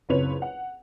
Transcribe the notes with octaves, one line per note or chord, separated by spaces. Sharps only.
F#1 C#2 C4 B4 C#5 F7
F#5